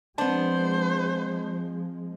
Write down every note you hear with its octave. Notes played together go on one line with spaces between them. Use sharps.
F3 G#3 B3 C4 D4 C5 A5